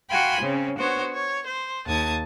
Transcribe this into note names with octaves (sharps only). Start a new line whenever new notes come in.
F#4 F5 G5 G#5 B5 C6
C#3 C4 C#4
B3 D4 F#4 C5 C#5
C#5
C5
D#2 A5 D#6 G#6